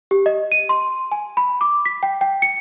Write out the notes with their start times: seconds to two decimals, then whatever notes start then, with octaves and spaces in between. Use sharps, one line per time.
0.11 G4
0.26 D#5
0.52 D#7
0.69 C6
1.12 G#5
1.37 B5
1.61 D6
1.85 B6
2.03 G5
2.21 G5
2.42 C#7